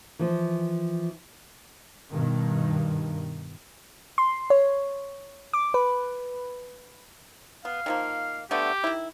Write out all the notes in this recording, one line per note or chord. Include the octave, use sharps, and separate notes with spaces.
E3 F3
G2 B2 D#3
C6
C#5
D6
B4
B3 F5
D#3 F3 A#3
D3 A3 B3 G4
D#3 E4